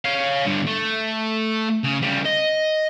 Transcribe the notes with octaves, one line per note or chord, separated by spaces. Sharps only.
C#5 F5
G2 D3
A3
C#3
C#3 G3
D#5